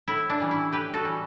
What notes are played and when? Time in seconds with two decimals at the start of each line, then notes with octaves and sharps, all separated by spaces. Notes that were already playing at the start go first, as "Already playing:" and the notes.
0.08 A2 E4
0.30 D4
0.40 E3 G3 C#4
0.51 E4
0.72 A2 G4 B4
0.94 F#4 A4
1.05 E3 G3 C#4